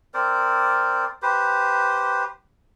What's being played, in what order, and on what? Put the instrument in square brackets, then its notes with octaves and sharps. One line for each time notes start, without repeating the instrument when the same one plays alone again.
[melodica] C4 A#4 C5 D5
G4 B4 C5